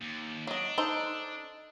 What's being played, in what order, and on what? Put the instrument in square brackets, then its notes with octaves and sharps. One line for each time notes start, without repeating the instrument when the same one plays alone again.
[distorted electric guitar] D#2
[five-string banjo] F#3 D#5 [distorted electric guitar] D4
[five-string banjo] D#4 A4 C5